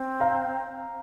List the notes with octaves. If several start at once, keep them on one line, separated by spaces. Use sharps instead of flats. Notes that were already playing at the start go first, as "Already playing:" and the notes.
Already playing: C4
F5 A#5